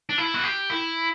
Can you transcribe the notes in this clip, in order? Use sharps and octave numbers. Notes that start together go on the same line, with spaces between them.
D4
E4
F#4
G4
E4